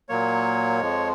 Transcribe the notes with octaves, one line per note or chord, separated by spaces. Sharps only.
A#2 F#3 A#3 C#5
F2 F3 G#3